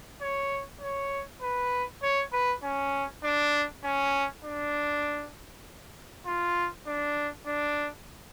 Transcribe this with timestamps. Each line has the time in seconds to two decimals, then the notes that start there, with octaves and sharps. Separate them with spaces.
0.21 C#5
0.81 C#5
1.42 B4
2.02 C#5
2.33 B4
2.63 C#4
3.24 D4
3.84 C#4
4.44 D4
6.26 F4
6.87 D4
7.47 D4